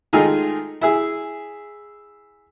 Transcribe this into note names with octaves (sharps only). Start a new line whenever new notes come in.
D#3 G#3 A3 F4 G#4 D#5
E4 G#4